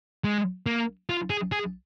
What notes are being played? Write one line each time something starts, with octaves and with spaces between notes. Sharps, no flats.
G#3
A#3
F4
G#4
G#4